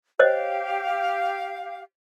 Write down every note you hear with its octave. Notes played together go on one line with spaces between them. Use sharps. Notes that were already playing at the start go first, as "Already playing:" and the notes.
G4 C5 C#5 D#5 F5